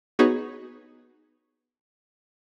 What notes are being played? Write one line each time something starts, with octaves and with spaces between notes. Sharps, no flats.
B3 D#4 F#4 G#4 B4 C#5